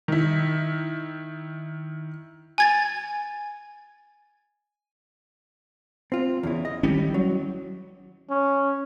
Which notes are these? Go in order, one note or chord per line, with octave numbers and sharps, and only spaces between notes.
D#3 E4
G#5 G#6 A6
C4 F4
E2 C#3 E4
D#5
D#3 G3 A3 C#4 E4 G4
F#3
C#4